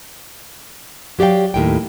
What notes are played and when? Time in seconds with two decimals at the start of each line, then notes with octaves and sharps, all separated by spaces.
1.19 F#3 G4 D5 F5 G5
1.54 D#2 A2 G5